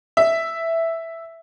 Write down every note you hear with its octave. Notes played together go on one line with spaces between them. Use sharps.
E5